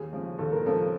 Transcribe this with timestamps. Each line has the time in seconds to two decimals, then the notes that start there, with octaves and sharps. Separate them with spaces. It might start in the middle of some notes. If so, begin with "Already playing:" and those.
Already playing: D#2 G#4
0.13 C#3 F3
0.38 D#2 A4
0.52 A#4
0.66 C#3 F3 A4